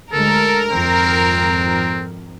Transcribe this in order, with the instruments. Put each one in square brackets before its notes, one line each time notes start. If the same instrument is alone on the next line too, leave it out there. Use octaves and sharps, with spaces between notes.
[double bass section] D2 G#3 [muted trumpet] A4 [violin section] A#4
[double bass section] G#1 F2 [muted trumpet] C4